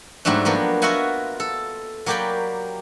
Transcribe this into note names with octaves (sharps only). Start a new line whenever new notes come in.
G#2 F#3 G3 A3 D4
F3 F#3 A#3 B3
F4 F#4 D#5 E5 F#5 G#5
A4
F#3 A#3 G4 D5 G5 B5